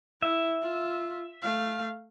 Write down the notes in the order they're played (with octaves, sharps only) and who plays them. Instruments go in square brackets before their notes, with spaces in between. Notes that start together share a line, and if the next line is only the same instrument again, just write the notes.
[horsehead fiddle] E4 [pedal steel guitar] E5
[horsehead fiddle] F4
A3 F5